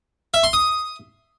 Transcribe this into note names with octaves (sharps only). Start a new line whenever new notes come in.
E5
C6
D#6